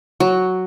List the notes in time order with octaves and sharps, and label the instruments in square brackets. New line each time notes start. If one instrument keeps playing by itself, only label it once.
[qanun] F#3